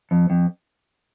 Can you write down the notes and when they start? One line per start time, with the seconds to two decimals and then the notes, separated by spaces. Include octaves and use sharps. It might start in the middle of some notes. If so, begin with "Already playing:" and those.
0.11 F2
0.30 F2